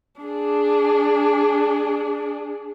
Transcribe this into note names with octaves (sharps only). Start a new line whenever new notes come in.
D4 G#4